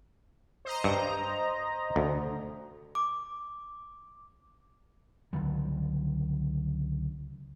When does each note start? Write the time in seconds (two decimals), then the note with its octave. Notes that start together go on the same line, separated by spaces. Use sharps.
0.65 C5 D#5 A#5
0.84 G2
1.96 D2
2.95 D6
5.33 C#2 D3 F#3 G3